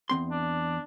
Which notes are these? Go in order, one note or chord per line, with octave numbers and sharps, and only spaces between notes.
E2 C4 C6
D4